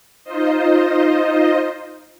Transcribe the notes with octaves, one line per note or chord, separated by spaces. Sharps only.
D#4 F4 C5 D#5